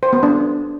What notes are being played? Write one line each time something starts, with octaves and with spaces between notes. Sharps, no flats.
C5
B3
D4